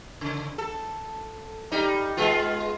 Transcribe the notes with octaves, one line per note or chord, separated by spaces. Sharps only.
C#3
A4
G3 D#4
G#3 B3 F4